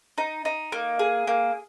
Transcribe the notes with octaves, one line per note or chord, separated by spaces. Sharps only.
D#4
D#4
A#3
G#4
A#3